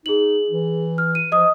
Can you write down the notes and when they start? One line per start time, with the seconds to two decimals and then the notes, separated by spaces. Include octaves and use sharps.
0.06 D#4 G#4 F#7
0.50 E3
0.98 F6
1.15 D#7
1.32 F3 D#5 D#6